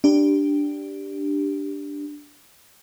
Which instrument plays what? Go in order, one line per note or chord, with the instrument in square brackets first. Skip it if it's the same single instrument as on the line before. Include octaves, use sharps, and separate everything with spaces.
[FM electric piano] D4 G4